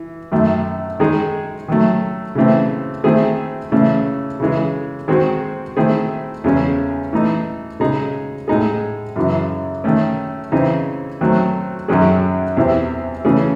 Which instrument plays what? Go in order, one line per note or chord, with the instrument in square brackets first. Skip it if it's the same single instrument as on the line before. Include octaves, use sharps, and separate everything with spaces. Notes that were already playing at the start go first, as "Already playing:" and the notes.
Already playing: [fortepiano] E3
F#2 D#3 A3
D#3 G#3 D#4 G#4
D#3 F#3 A3
C#3 E3 A3 C4
D#3 A3 C4 E4 G#4
C#3 E3 A3 C#4
C#3 E3 G#3
D#3 G#3 C4 F#4
D#3 A3 C4 E4 G#4
E2 C#3 G#3 C#4
E3 A3 D#4
C#3 G#3 D#4 G#4
A2 G#3 D#4 G#4
F#2 C#3 E3
D#3 A3 C#4
C#3 E3 C4 D#4
D#3 F#3 A3 C4
F#2 D#3 F#3 C#4 G#4
E2 C3 E3 C4 E4
C#3 E3 A3 C#4 G#4